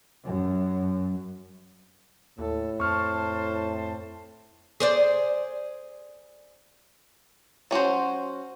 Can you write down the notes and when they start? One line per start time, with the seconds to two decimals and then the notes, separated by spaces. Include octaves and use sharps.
0.24 F#2
2.39 D#2 A2 A4
2.80 F2 C5 A5 C#6 F6
4.80 G#4 C5 D5
7.71 F#3 C#4 F#4 C5